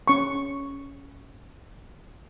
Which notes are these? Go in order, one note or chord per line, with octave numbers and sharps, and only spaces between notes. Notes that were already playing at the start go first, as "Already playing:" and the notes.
C#4 C#6